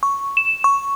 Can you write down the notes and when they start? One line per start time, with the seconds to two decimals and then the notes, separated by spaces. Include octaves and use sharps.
0.03 C#6
0.37 E7
0.64 C#6